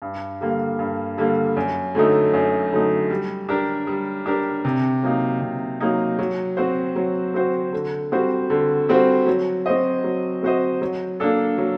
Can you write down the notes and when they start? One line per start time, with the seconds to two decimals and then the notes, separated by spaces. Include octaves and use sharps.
0.02 G2
0.41 D3 G3 A#3
0.79 G2
1.18 D3 G3 A#3
1.57 F#2
1.95 D3 F#3 A3 D#4
2.33 F#2
2.72 D3 F#3 A3 D#4
3.10 G3
3.49 D4 G4 A#4
3.87 G3
4.26 D4 G4 A#4
4.65 C3
5.03 F#3 A#3 D#4
5.41 C3
5.80 F#3 A#3 D#4
6.19 F#3
6.57 C4 F#4 C5
6.96 F#3
7.34 C4 F#4 C5
7.73 D3
8.12 G3 C4 F#4 C5
8.50 D3
8.89 G3 C4 F#4 C5
9.26 F#3
9.66 C4 F#4 C5 D#5
10.04 F#3
10.43 C4 F#4 C5 D#5
10.81 F#3
11.20 A#3 D4 A4
11.58 F#3